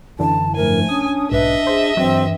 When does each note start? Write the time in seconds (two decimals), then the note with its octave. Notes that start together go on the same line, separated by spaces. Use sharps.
0.19 F#2 D3 E3 A5
0.56 G#2 F3 A3 A#4 G#5
0.89 C#4 D4 D#6
1.32 B1 G#2 B4 D#5 E5
1.67 G#4 C5
1.97 G2 E3 F#3 C4